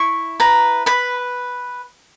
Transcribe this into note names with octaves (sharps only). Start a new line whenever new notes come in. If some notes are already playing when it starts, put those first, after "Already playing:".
Already playing: E4 C#6
B4 A#5
B4 B5